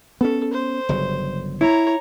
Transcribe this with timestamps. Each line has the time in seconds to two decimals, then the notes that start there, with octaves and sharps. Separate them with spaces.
0.21 B3 C#4 A4
0.53 C5
0.89 G1 C#3 F#3
1.61 E4 C#5 A#5